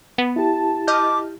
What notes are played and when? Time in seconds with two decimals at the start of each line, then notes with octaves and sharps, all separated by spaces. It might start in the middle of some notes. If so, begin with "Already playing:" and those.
0.18 B3
0.36 E4 G4 A5
0.87 D#5 D6 F6 G6